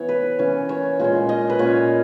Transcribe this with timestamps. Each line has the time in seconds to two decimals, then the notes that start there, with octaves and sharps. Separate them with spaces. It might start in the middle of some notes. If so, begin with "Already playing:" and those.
Already playing: E3 B3 C#5
0.09 B4
0.39 E3 A#3 C#4
0.69 C#5
0.99 A#2 G#3 C#4
1.29 D#5
1.50 B4
1.59 A#2 A#3 C#4 C#5